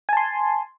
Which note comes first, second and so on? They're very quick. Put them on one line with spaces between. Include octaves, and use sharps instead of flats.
G#5 A5 C6